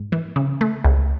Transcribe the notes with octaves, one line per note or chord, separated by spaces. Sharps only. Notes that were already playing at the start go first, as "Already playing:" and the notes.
Already playing: G#2
E3
C#3
A3
C#2